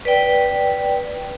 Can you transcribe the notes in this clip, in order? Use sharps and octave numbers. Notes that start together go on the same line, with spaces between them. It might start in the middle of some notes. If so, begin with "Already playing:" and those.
B4 D5 G5